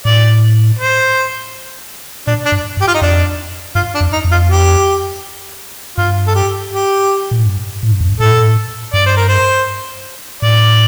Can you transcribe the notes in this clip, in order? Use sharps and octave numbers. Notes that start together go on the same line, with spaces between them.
A2 D5
C5
A#2 D4
D4
G2
G2
G4
F4
D#4
F2 D4
G2 F4
D4
F2
D#4
F2
F4
G4
G2 F4
A4
G4
G4
A#2
A2
G2
A2
G2
F2
G2
A2 A4
A#2
A2
G2 D5
C5
A#4
C5
A2 D5